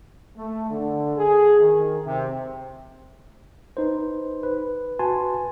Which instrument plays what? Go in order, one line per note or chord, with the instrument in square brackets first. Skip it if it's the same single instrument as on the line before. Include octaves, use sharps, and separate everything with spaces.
[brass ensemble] A3
D3
G#4
D#3
C3
[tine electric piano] D#4 B4 C5
B4
F#4 B4 G#5 A5 C6